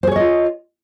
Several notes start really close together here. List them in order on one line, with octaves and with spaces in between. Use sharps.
C5 G#4 C#5 D#5 F4